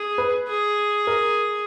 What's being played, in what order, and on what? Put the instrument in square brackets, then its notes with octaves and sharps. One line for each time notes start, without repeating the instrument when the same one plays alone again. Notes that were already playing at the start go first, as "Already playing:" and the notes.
Already playing: [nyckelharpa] G#4
[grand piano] B4
[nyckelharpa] G#4
[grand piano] A#4